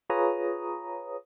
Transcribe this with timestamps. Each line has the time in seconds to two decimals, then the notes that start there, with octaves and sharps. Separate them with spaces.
0.10 F4 G#4 B4 C#5 A#5 D#6